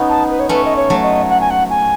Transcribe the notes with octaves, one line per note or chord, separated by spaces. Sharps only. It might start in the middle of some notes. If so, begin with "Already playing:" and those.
Already playing: B3 C#4 D#4
A5
B4
C#5
A3 C#4 B4
D#5
C#5
F#3 A3
D#5
F#5
G#5
F#5
G#5